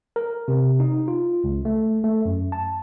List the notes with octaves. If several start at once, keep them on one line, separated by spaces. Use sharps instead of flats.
A#4
C3
D#4
F4
C#2
A3
A3
F#2
A5